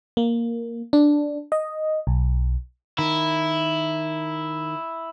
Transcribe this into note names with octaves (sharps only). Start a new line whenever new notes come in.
A#3
D4
D#5
B1
D#3 E4